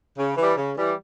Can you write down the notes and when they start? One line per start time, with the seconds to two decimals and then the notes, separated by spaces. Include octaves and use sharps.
0.17 C#3
0.36 E3 G3
0.56 C#3
0.76 E3 G3